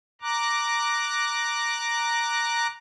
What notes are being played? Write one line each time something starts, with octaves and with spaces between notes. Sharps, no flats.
A#5 D6 F#6